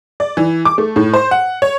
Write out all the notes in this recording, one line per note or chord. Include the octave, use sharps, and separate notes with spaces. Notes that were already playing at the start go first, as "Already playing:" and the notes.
D5
E3
D6
A3
A2
C5
F#5
C#5